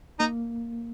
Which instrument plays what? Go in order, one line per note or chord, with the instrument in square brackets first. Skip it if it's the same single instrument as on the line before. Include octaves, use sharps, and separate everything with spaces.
[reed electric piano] A#3 [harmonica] D#4